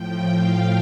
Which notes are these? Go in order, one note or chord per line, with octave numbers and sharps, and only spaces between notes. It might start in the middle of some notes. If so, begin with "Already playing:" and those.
Already playing: A2 F3 G5
F5